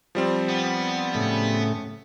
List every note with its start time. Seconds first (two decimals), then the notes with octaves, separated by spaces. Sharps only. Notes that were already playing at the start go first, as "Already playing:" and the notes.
0.15 F3 G3 C4
0.49 B3
1.15 A2 C#3 A3